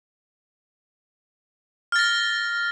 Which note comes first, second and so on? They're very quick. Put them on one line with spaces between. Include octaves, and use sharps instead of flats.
F6 A6 A#6